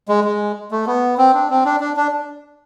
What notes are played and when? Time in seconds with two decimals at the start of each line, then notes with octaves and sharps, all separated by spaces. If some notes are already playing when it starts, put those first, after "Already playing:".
0.08 G#3
0.24 G#3
0.71 A3
0.87 B3
1.18 C4
1.34 D4
1.50 C4
1.65 D4
1.80 D4
1.96 D4